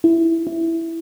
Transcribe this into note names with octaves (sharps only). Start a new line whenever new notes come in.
E4
E4